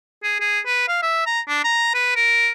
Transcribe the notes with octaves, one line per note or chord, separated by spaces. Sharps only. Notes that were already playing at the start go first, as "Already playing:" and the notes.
G#4
G#4
B4
F5
E5
A#5
D4
A#5
B4
A#4